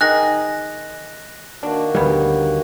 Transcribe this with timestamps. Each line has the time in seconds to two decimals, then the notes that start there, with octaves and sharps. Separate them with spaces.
0.01 D#3 G#4 F#6 A#6
1.63 D#3 A#3 D4 F#4
1.95 D2 F#3 G3 B3